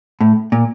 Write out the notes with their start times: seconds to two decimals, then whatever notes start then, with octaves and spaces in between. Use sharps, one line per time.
0.21 A2
0.52 A#2